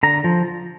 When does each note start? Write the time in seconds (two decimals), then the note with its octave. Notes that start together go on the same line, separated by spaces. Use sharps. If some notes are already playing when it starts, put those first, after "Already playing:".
0.03 D3 A#5
0.24 F3